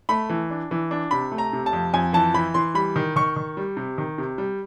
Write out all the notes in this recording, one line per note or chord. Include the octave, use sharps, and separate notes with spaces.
A3 B5
E3
D4
E3
D4
C3 B5
A3
A#5
C3
A5
F2
F2 G#5
E3 A5
E3 B5
E3 C6
G3 B5
D#3
D#3 C#6
D#3
G3
C3
D#3
C3
G3